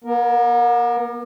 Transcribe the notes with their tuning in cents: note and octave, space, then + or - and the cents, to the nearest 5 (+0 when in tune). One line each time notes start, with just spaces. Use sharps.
B3 -45 A#4 +5